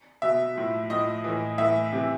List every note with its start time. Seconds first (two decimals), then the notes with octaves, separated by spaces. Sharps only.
0.22 B2 E5
0.56 A2 F3
0.90 A2 F3 D#5
1.24 A2 E3
1.58 A2 E3 E5
1.93 C3 E3